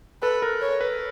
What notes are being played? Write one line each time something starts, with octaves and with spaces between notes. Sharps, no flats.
A4 B4
A#4
C#5
B4